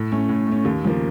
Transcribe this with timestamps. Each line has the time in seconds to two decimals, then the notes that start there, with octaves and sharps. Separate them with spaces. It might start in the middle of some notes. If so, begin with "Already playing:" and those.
Already playing: A2
0.12 A3 C#4
0.29 A2
0.47 A3 C#4
0.65 D#2
0.84 C#3 F3 A#3